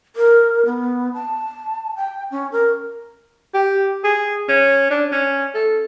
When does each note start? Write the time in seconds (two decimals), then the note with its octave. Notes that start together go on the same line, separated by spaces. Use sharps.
0.16 A#4
0.66 B3
1.14 A5
1.96 G5
2.31 C#4
2.52 A#4
3.54 G4
4.04 G#4
4.48 C#4
4.91 D4
5.12 C#4
5.54 A4